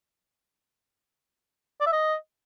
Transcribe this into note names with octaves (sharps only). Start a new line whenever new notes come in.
D5
E5
D#5